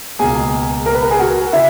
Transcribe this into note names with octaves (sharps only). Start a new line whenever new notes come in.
C#2 B2 A#3 G#4 G#5
A#4 A#5
B4 B5
A#4 A#5
G#4 G#5
F#4 F#5
C#3 E4 E5